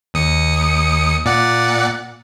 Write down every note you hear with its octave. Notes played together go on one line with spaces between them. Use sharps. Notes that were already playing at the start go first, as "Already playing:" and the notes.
D#2 D#6 C#7
A#2 D5 F#5